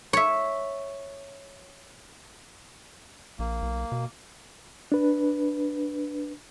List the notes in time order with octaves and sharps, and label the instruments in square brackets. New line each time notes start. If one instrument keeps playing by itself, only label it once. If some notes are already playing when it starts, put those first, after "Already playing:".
[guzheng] C#5 E5
[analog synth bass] A#1 [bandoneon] A#3
[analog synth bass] B1
B2
[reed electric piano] D4 B4